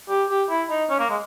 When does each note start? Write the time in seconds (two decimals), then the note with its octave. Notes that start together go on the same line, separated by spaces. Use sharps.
0.09 G4
0.29 G4
0.49 E4
0.70 D#4
0.90 C#4
0.99 A#3
1.10 G#3